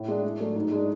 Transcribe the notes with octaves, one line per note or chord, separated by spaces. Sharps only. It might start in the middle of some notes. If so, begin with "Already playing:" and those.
Already playing: A2
G#3 D4
A2
F#3 A3 D4
G#2
G#3 D4